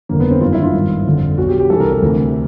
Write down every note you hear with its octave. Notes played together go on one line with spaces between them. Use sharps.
G1 F2 D3 A#3
B3
C4
G1 F#2 D#3 F4
E4
F4
G#1 G2 D#3
G1 F2 D3
B1 B2 F#4
G4
G4
C2 C3 E3 A4
A#4
A#4
D2 C3 E3